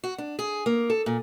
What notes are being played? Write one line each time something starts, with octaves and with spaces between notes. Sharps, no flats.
F#4
D4
G#4
A#3
A4
A#2